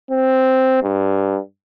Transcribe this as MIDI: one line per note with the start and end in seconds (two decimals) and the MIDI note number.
0.11 0.80 60
0.83 1.39 43